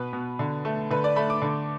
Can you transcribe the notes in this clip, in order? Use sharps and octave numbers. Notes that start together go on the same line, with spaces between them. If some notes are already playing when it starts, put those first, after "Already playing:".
Already playing: B2 B3 B4
B2
D3
A3
D3 B4
D5
A3 B5
D6
D3